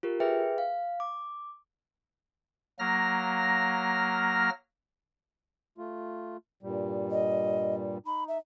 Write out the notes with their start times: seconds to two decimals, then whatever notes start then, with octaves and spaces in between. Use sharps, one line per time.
0.03 F4 G4 A#4
0.20 G#4 B4 E5 G5
0.58 F5
1.00 D6
2.79 F#3 A#3 F6 A#6
5.78 A3 F4
6.63 G2 A#2 G3
7.11 D#5
8.06 D#4 B5
8.28 E5